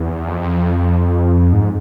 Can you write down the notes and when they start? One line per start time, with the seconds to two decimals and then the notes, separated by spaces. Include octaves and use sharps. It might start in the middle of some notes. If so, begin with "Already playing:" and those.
Already playing: E2
0.27 F2
1.53 G#2